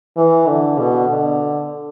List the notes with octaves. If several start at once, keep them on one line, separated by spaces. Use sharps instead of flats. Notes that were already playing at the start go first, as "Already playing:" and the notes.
E3
D3
B2
D3